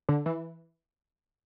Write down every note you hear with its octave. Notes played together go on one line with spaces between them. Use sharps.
D3
E3